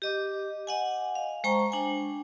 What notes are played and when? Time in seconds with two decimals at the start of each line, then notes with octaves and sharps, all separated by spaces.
0.02 G4 D#5 D6
0.67 D#5 F#5 G#5
1.15 F5
1.44 G#3 C5 G5 A5 A#5 C#6
1.72 D4 G5 G#5